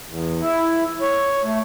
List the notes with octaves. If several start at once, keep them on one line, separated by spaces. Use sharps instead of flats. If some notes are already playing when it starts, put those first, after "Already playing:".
E2
E4
C#5
A3